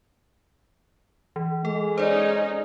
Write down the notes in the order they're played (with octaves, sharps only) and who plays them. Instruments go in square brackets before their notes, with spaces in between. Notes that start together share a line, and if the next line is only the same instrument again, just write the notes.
[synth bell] E3
[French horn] G#3 [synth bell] A4
[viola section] C#4 D#4 [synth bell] C5 D5